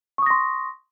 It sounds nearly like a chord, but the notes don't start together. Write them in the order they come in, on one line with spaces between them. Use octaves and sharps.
C#6 D#6 A#6 C6